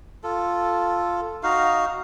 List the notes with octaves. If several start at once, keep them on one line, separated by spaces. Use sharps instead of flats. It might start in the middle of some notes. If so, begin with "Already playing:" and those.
F4 A4
D#4 F#4 F5